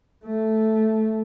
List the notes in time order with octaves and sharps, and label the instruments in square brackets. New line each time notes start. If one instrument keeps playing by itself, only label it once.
[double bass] A3